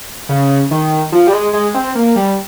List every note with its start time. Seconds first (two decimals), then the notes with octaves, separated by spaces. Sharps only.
0.29 C#3
0.71 D#3
1.12 F3
1.27 G3
1.33 G#3
1.53 G#3
1.74 C4
1.95 A#3
2.16 G3